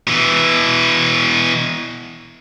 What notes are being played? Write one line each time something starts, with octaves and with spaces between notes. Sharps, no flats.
B2 E3